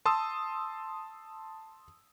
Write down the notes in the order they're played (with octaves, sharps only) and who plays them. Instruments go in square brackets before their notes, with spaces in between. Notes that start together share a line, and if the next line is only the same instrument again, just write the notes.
[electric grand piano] A5 C6 D#6 E6